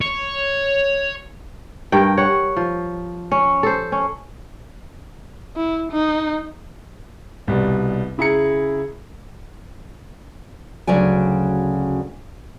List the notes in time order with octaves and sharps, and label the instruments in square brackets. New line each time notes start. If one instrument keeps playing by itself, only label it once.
[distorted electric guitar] C#5
[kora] G2 A#4 G5
C#5 F#5
F3
C#4
A4 C5
C#4
[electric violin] E4
D#4
[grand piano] C2 B2 G3
C#3 E4 G#4 A#5 C#7
[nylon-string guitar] D2 C#3 F#3 D5 G#5